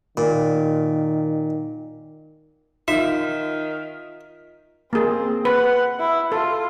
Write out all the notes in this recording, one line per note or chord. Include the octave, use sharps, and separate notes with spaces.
A#2 D#3
D#3 D#4 F4 E5
A#3 C4 G#4
B4 F#5
E4
F4 A4